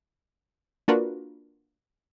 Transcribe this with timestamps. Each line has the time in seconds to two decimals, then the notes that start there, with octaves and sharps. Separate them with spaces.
0.88 A#3 D4 F4 F#4 A#4 B4